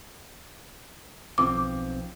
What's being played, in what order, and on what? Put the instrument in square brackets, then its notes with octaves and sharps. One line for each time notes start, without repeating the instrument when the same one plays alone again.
[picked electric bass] B1 F3 C4 [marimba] D6